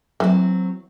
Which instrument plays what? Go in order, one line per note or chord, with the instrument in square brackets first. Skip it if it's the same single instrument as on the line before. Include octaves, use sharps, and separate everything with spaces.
[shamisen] E3 [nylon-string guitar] F#3 C4